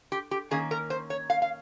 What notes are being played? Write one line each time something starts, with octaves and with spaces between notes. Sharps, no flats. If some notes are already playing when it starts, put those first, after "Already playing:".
G4
G4
D#3 A#3 C#4 G#4
A#4
C5
C#5
F5
F5